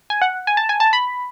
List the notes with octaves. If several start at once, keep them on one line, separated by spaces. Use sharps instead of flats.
G#5
F#5
G#5
A5
G#5
A5
B5